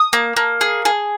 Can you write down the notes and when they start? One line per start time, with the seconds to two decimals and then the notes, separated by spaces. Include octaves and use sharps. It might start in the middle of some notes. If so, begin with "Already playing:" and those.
Already playing: D#6
0.13 A#3
0.37 A#3
0.61 G#4
0.85 G#4